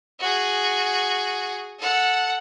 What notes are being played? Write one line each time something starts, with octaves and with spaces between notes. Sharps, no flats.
F#4 G#4
A4 F#5